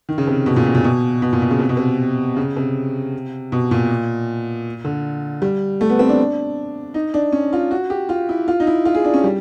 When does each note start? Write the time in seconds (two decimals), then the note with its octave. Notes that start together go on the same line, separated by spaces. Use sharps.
0.09 D#3
0.18 C#3
0.27 C3
0.46 B2
0.56 A#2
0.66 B2
0.75 A#2
0.84 B2
1.22 B2
1.33 A#2
1.42 B2
1.51 C#3
1.59 C3
1.69 B2
1.77 C3
2.37 C#3
2.57 C3
3.52 B2
3.71 A#2
4.84 D3
5.42 G3
5.81 A3
5.90 B3
5.99 C4
6.09 D4
6.94 D#4
7.14 D4
7.32 C#4
7.53 F4
7.71 F#4
7.90 G4
8.09 F4
8.29 E4
8.48 F4
8.60 D#4
8.67 E4
8.85 F4
8.95 G#4
9.05 D4
9.14 C#4
9.24 G3